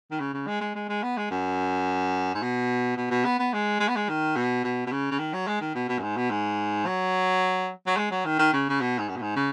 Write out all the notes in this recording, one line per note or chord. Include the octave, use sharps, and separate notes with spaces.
D#3
C#3
C#3
G#3
G#3
G#3
G#3
B3
G#3
F#2
G#2
B2
B2
B2
B3
B3
G#3
G#3
B3
G#3
D#3
B2
B2
B2
C#3
C#3
D#3
F#3
G#3
D#3
B2
B2
F#2
G#2
B2
G#2
F#3
F#3
G#3
F#3
D#3
D#3
C#3
C#3
B2
G#2
F#2
B2
G#2
C#3